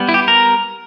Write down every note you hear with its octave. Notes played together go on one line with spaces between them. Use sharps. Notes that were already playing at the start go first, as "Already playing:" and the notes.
Already playing: G3 B3
E4
G4
A#4